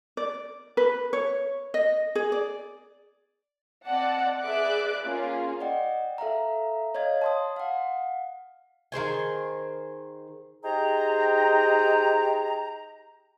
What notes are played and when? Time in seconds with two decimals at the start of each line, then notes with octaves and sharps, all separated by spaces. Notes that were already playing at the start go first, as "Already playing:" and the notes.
0.17 D5
0.77 B4
1.13 C#5
1.74 D#5
2.15 G#4
2.32 D5
3.86 C4 D5 D#5 F#5 A5
4.41 G#4 B4 D5 E5 D6 F#6
5.04 A#3 C#4 F4 G#4
5.60 D5 D#5 F#5 G5
6.18 A4 E5 F5 A#5
6.95 C#5 D#5 F5 G#6
7.22 A5 C6 D#6
7.56 F5 F#5
8.92 D#3 G#4 C5 G#5
10.64 D#4 G4 G#4 C5 G5 A#5